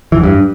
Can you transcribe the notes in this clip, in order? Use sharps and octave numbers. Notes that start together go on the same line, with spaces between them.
E3
F#2
G2